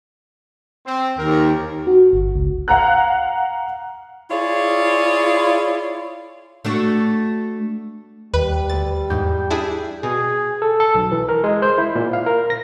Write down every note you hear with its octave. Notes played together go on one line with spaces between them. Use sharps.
C4
D#2 A#4
F#4
G1
C#2
F5 F#5 A#5 F#6
E4 F4 G#4 C#5 D5 F5
A3 D4 F#4
D#2 G3 B4
D2 A6
E2 G#2 G6
D4 E4 G#4
B2 G#4
A4
A4
B1
E3
A#4
G#3
C5
E4
A#2
F5
A#4
A#6